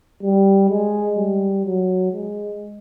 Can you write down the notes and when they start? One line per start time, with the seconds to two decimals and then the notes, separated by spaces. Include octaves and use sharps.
0.23 G3
0.70 G#3
1.17 G3
1.65 F#3
2.12 G#3